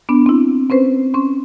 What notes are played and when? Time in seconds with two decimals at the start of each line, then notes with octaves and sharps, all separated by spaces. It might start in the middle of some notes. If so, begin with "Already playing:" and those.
0.09 B3 D4
0.26 C4 E4
0.70 C4 C#4 B4 C5
1.14 C#4 C6